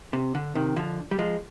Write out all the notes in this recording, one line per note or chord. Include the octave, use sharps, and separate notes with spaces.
C3
D3
C3 D#3
D3 F3
G3
F3 G#3